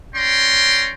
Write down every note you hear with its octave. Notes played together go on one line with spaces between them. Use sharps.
C#4 C#5 D5 G5 A#5 C6